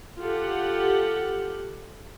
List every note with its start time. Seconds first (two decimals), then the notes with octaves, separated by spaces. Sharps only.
0.19 F4 G4 A4 F#5